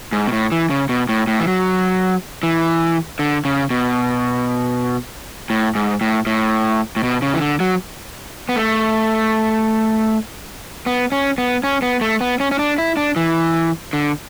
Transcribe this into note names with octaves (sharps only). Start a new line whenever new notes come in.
G#2
B2
A2
E3
C#3
B2
A2
A2
E3
F#3
E3
D3
C#3
B2
A2
G#2
A2
A2
A2
B2
C#3
E3
D3
F#3
B3
A3
B3
C#4
B3
C#4
B3
A3
B3
C#4
C#4
D4
E4
D4
E3
D3